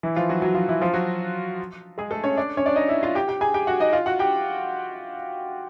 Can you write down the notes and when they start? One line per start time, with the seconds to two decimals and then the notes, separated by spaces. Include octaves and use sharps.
0.03 E3 E4
0.16 F3 F4
0.29 F#3 F#4
0.42 F#3 F#4
0.55 F3 F4
0.69 E3 E4
0.81 F3 F4
0.94 F#3 F#4
1.98 G#3 G#4
2.11 A3 A4
2.24 C#4 C#5
2.37 D4 D5
2.57 C#4 C#5
2.66 D4 D5
2.76 D#4 D#5
2.89 E4 E5
3.03 F4 F5
3.15 G4 G5
3.28 G4 G5
3.41 G#4 G#5
3.54 G4 G5
3.67 F#4 F#5
3.80 D#4 D#5
3.93 F4 F5
4.06 F#4 F#5
4.19 G4 G5